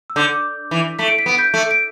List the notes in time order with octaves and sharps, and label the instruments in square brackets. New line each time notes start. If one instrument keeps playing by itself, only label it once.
[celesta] E6
[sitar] D3 [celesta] D6 G6
[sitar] E3
[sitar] A3 [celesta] B6
[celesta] D7
B6
[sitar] B3 [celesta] D7
[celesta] G6 B6
[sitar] A3
[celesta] D7